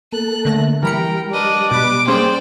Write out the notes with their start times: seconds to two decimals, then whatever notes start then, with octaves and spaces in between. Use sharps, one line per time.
0.12 A#3 A4 F#6
0.45 D3 A3 A#6
0.83 E3 G3 A#4 G5 B5 C#7
1.31 D4 B4 D#5
1.71 B2 B4 D6
2.07 A#3 C#4 G#4 C5 D5 G5